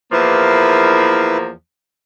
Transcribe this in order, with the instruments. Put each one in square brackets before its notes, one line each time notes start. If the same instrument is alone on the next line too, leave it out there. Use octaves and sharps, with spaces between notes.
[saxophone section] E2 F3 A#3 [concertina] E4 B4